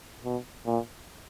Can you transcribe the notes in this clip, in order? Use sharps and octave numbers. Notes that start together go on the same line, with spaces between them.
B2
A#2